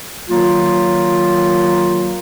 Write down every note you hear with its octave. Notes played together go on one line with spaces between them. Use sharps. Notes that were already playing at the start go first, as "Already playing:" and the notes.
D#3 F#3 A#3 F4